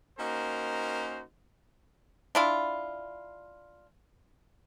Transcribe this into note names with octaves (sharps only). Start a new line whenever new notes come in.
A#3 C#4 D#4 F#4 A#4 C5
D4 E4 F4